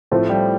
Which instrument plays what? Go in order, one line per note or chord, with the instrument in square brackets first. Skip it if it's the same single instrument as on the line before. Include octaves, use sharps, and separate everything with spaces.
[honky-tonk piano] A2 F3 C4 [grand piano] A3
[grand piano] G3